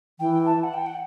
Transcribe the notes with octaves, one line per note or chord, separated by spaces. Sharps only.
E3 G5
A5
F#5
G5
F#5